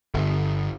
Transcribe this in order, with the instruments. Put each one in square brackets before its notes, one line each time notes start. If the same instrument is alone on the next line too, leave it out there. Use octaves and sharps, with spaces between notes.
[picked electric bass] G1